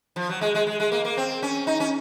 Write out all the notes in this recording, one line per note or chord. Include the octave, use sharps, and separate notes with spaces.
F3
F#3
G#3
G#3
G#3
G#3
A#3
A#3
C4
C#4
D#4
C#4